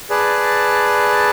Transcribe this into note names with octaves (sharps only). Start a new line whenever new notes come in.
G#4 B4 D5 A5